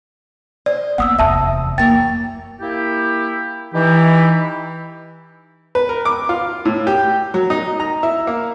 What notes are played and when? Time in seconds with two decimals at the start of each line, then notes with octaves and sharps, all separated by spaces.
0.66 C5 D5 D#5
0.98 A#3 B3 F#5 D#6 E6
1.19 F1 E2 E5 A5 E6
1.78 F#2 E3 A#3 C#5 G5 A6
2.61 A#3 E4 G4
3.74 E3 D#4 E4 G4
5.75 B4
5.89 A#4
6.05 D6
6.29 F4
6.65 A2
6.87 G4
7.34 F#3
7.50 D#4
7.80 A#5
8.03 E4
8.27 A#3